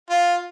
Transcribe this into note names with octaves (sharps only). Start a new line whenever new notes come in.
F4